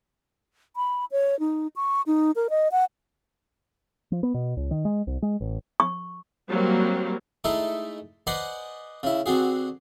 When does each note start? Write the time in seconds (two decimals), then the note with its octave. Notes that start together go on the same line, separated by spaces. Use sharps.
0.76 B5
1.12 C#5
1.40 D#4
1.76 C#6
2.07 D#4
2.36 A#4
2.50 D#5
2.72 F#5
4.12 F3
4.23 B3
4.34 B2
4.57 C#2
4.71 D#3
4.85 G#3
5.07 C2
5.22 G#3
5.41 A1
5.80 C#6
6.47 F#3 G3 A#3 C4
7.44 G#3 A3 D#4 E4 A4
8.27 B4 C5 D5 D#5 F#5 G#5
9.03 C#3 E4
9.26 D3 C4 F#4 G#4